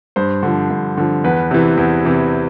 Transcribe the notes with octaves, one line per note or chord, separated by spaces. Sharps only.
G2 C5
D3 F3
G2
D3 F3
E2 B4
C3 E3
E2
C3 E3